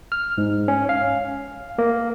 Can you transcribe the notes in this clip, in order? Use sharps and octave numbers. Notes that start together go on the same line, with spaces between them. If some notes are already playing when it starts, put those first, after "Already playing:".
F6
G#2
C#4
F5
A#3